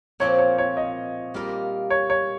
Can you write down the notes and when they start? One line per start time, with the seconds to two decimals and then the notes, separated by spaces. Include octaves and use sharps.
0.20 A#2 F3 C4 C#5
0.39 C#5
0.58 C#5
0.77 D#5
1.34 G3 A#3 F4 A#4
1.90 C#5
2.10 C#5